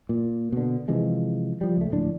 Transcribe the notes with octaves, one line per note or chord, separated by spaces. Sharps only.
A#2
B2 D3
C3 E3 F3 G#3
F3 G3
C#2 A3
D1 A#1 A2 D4